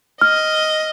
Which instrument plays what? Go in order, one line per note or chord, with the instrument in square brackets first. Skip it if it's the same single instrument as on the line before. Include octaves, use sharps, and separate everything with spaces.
[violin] D#5 [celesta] F6